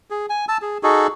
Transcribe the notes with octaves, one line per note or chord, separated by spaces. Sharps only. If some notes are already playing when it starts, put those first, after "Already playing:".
G#4
G#5
A5 E6
G#4
D#4 F#4 G#4 A4